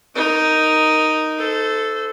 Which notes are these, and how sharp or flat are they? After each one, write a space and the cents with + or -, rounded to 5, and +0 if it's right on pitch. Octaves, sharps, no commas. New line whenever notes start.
D#4 +0 A#4 +0
A4 +0 C5 -25